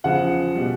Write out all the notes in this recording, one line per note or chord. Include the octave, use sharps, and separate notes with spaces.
E2 C#3 F3 F#5
B2 G3